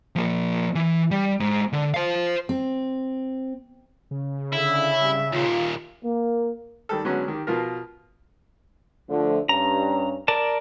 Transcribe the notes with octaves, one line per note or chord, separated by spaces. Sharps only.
F3 A#3
E3
G3
G#3 C5
D3
C5 F5
C4
C#3
D3 E4 E5
G#2 C3 G3
D#2 A#2 F4
A#3
D#3 G3 A4
D3 F#3 G#3 B3 C#4
D#3 G4
B2 F3 F4 A#4
D3 F3 A3
G2 C#4 A#5
A#4 D5 A5